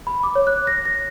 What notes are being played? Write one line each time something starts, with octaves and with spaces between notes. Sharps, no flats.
B5
D6
C#5
F#6
A#6
A#6